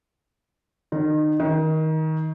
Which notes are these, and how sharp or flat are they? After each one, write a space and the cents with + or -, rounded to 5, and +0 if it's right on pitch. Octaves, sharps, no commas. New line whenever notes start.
D#3 -30
D#3 +20